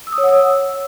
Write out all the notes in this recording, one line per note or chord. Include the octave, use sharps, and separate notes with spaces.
E6
D#6
C#5
F#5
E6